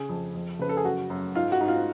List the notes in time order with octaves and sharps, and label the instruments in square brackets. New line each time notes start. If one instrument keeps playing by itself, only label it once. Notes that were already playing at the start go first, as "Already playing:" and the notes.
Already playing: [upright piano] C#3 G#4
F2
F2
C#3 B4
A4
G#4
F#2 F#4
F#2
G#2 F4
F#4
G#2
F4